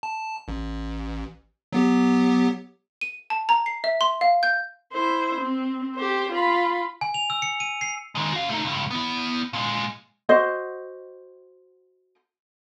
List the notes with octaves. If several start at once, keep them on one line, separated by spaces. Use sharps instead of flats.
A5
A1
F#3 B3 G4
D#7
A5
A#5
C7
E5
C6
F5
G6
E4 C5
C4
G4 C5
F4 B5
G#5
F7
E6
C#7
D#7
C7
D#3 G#3
F#4 F5
A3 D#4
C#2 G2
B3 E4
A#2 G#3
F#4 C5 D#5